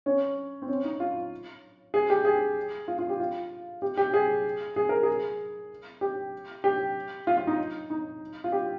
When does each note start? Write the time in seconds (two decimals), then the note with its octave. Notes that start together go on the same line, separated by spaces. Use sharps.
0.06 C#4
0.62 C4
0.68 C#4
0.84 D#4
1.00 F4
1.94 G#4
2.10 G4
2.25 G#4
2.88 F4
2.99 F4
3.09 G4
3.20 F4
3.82 G4
3.97 G4
4.14 G#4
4.76 G#4
4.89 A#4
5.03 G#4
6.01 G4
6.64 G4
7.27 F4
7.37 F4
7.47 D#4
7.90 D#4
8.44 F4
8.52 G4